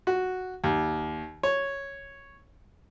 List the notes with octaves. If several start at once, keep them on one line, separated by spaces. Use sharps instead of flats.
F#4
D#2
C#5